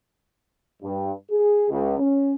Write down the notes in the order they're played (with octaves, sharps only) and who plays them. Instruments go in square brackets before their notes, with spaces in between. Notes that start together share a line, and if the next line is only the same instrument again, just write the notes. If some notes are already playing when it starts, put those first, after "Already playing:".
[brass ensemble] G2
G#4
C#2
C#4